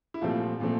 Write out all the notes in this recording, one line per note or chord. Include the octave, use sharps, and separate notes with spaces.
E4
C2 A#2 F3 A3 C4 F4
A#2 F3 A3 C4